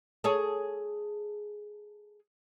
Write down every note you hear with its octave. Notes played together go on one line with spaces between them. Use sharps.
G#4 A4 C#5